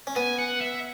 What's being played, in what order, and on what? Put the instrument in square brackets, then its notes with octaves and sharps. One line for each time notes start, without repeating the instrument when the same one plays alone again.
[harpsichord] C#4
[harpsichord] B3 [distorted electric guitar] G#5
[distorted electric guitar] F#5
E5